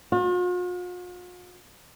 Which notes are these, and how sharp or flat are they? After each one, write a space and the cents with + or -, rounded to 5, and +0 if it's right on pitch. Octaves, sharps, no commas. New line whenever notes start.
F4 +45